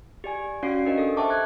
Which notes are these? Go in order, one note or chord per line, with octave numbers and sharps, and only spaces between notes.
G4 D5 G#5
C#4 F#4 D5 F5 C7 D7
D4 G4 A#4 C5 D#5
A4 D#6
C5 E5 G5 A5 C#6 D6
E5 A5 F#6 G#6